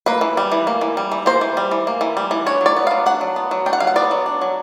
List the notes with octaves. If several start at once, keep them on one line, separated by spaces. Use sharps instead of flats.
A#3 B4
E3
G3
E3
A#3
E3
G3
E3
A#3 C5
E3
G3
E3
A#3
E3
G3
E3
D4 C#5
F#3
D5
B3
F#3 F5
D4 F#5
F#3
B3
F#3
D4 G5
F#5
F#3 F5
F#5
B3 D5
F#3
D4
F#3